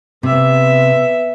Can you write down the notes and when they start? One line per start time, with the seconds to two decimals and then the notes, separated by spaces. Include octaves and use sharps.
0.23 C3 B3 E5